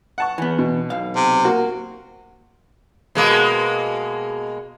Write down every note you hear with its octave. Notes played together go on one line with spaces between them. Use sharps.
F#5 A5 C#6
E3 B3
B2
B1 F5
C3
A#3 F#4
B2 G#3 A#3